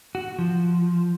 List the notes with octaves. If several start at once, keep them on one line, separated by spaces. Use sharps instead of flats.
F#4
F3